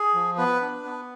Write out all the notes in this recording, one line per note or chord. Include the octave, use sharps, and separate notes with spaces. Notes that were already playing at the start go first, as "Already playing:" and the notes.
Already playing: G#4
F3
B3 B4
D4
B3